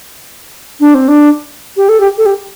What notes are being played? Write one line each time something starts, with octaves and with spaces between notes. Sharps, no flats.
D4
C4
D4
G4
A4
G4
A4
G4